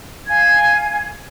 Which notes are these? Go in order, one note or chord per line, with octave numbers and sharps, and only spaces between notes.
F5 G#5 G#6